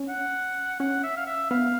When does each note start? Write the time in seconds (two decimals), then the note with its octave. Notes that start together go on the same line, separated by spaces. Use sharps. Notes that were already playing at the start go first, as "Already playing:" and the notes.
Already playing: C#4
0.09 F#5
0.79 C#4 F#5
1.03 E5
1.17 F5
1.26 E5
1.50 B3 F5